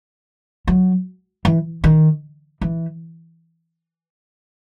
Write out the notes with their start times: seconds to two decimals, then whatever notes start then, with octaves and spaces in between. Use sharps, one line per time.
0.67 F#3
1.45 E3
1.84 D#3
2.61 E3